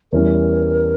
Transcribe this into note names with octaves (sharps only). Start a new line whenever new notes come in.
E2 E3 G3 C#4 A#4